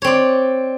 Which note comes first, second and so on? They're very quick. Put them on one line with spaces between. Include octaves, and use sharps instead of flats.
C#5 C4 D5